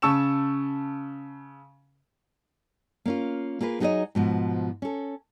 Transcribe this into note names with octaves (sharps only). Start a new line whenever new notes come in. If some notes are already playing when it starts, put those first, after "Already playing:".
C#3 A5 C#6 E6 E7
A#3 C#4 F4
A#3 F4 G#4 B4
F#3 D#4 G#4 A#4 C#5 D#5
G#2 B2 F3
C#4 A4